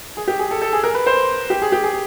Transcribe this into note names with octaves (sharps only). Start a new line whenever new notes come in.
G#4
G4
G#4
A4
A4
G#4
A#4
B4
C5
G4
G#4
G4
G#4